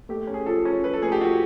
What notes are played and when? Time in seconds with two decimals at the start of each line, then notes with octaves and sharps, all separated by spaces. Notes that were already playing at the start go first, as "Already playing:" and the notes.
0.09 A3 G4
0.27 C#4
0.34 G#4
0.46 F3 A4
0.65 C#4
0.84 F3 B4
0.93 A4
1.02 A3 G#4
1.12 G4
1.20 F3 F#4